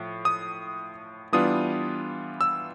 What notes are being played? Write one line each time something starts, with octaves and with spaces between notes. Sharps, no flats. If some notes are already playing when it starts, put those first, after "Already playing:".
Already playing: A2 F3
D#6
E3 G3 B3 D4 F4 D#6
E6